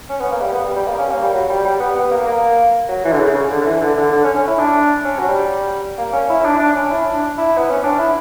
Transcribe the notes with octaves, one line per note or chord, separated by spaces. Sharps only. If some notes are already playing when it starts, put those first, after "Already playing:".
C#4
B3
A#3
G3
B3
G3
G3
A#3
C#4
A#3
G3
F#3
G3
G3
B3
B3
A#3
A#3
F#3
E3
D3
C#3
C#3
D3
D3
E3
D3
D3
D3
C#4
C#4
E4
D4
C#4
F#3
G3
A#3
C#4
E4
E4
D4
D4
C#4
E4
D4
E4
B3
C#4
D4
E4